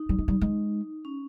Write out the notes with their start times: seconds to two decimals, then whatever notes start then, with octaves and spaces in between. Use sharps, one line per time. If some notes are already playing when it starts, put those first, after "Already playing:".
Already playing: D#4
0.09 G3
0.18 G#3
0.28 G3
0.41 G#3
1.05 C#4